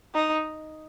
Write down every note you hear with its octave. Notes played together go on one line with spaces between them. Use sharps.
D#4